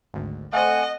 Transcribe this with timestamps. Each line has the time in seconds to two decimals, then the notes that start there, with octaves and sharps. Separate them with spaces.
0.14 G#1 D2
0.53 A3 C4 D#5 F#5 G#5